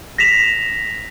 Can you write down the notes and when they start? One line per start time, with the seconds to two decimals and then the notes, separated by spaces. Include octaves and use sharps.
0.18 A#6 B6 E7 F7